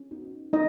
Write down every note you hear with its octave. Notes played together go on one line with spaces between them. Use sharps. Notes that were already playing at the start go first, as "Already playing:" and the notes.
Already playing: C#4
B3 D#4 F#4
B3 D#4 D#5